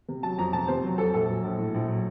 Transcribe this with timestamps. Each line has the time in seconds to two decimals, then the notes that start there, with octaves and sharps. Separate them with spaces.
0.09 C3
0.23 F#3 A5
0.38 F2 A#5
0.53 F1 A5
0.68 C3 C5
0.83 F#3
0.98 F2 A4
1.13 A#1 A4
1.29 F#3
1.43 A#1
1.58 A2
1.74 A#1
1.88 F#3